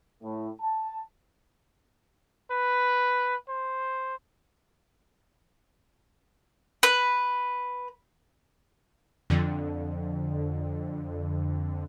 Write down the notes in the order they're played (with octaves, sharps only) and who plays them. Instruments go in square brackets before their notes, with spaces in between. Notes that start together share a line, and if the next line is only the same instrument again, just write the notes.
[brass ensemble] A2
A5
[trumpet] B4
C5
[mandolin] B4
[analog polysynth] F2 D3